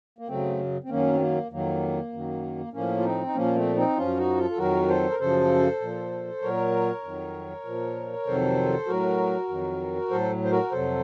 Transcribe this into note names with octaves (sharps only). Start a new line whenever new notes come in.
A#3
F#2 C#3 F#3 A3 C4
C4
F#2 D#3 F#3 A#3 C#4
C4
A#3
F2 D#3 F#3 A#3
F#2 D#3 F#3
A2 F3 A#3 C#4
F4
C4 D#4
D#4
A#2 F3 A#3 C#4
A3 C4
C4 D#4
F#2 F3 C#4 F4
D#4 F#4
F4 A4
A4
F2 D#3 F#3 F#4 A#4
A4 C5
A#4
F#2 C#3 F3 A4 C5
A#2 F3
A#2 F#3 A#4 C#5
F2 D#3 F#3
A#2 F3
F2 C3 D#3 F#3 A4 C5
A2 F#3 F#4 A#4
F2 D#3 F#3
A2 F#3 A4 C5
C5
F#4 A#4
F2 C3 F#3 A4 C5